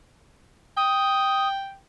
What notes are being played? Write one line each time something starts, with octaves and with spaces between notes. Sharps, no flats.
G5 D#6